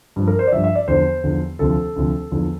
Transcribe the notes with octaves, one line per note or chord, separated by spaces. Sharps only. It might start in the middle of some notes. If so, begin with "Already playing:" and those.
G2 F3
A#4
C5
D5
G2 F3 E5
E5
D5
E2 D3 F3 C5
E2 D3 F3
D2 C3 F3 A4
D2 C3 F3
E2 D3 F3